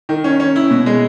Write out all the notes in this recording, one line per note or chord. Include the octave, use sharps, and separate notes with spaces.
D#3
C#4
C#4
E4
B2
G#3